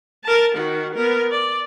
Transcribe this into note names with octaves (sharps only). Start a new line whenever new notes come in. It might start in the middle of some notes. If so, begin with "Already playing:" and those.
A#4 A5
D#3 F#4
B3 A#4
D5